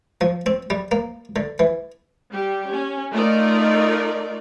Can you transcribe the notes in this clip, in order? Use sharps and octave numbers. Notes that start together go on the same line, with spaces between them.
F3
C4
G3
A#3
D3
E3
G3 G4
C#4
A3 D#4 F4 A#4 D5